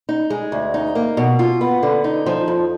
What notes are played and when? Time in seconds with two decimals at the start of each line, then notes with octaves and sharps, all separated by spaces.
0.09 D#4
0.30 G#3
0.52 D2
0.74 D#4
0.95 A#3
1.17 B2
1.39 F4
1.61 B3
1.83 D3
2.04 D#4
2.26 F3
2.48 F2